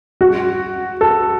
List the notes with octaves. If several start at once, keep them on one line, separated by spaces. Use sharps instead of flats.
F#4
A4